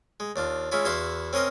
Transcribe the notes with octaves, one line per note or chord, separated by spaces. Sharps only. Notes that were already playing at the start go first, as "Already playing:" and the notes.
G#3
D#2 D4 F4
G#3 C#4 E4 F4
E2 E4 F#4 F5 C6
C4 C#4 A#4 D#5 C6